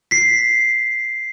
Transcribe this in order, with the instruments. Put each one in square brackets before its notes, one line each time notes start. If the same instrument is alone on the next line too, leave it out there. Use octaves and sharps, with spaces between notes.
[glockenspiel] B6 C7